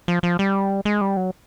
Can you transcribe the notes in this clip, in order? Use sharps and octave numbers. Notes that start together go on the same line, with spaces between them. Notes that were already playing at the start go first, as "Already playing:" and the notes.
F3
F3
G3
G#3
G3
F#3